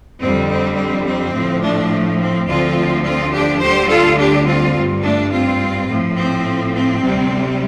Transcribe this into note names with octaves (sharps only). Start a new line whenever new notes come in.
F2 D3 G3 C4
C4
C4
C4
A2 F3
A3 D4
A3
C4
D2 D3 F3 C4 F4
C4 F4
D4 G4
D2 D3 G3 G4 C5
F4 A4
D4 G4
C4 F4
G2 G3
A3 D4
C4 F4
A2 F3
C4
C4
D2 C3 G3